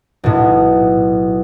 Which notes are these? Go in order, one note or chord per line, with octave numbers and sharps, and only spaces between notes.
B1 A2